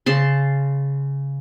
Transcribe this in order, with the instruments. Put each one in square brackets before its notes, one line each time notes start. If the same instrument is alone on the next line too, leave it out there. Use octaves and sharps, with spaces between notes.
[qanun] C#3 A5 C6